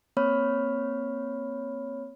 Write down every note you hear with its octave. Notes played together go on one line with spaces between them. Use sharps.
A#3 C4 C#5 B5 F6